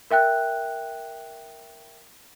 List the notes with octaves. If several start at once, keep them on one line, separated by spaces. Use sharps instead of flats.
A#4 E5 G5 F#6